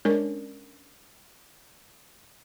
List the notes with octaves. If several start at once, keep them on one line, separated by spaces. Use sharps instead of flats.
G#3 C#4 D4 A#4